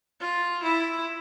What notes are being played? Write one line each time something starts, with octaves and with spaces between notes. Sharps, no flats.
F4
E4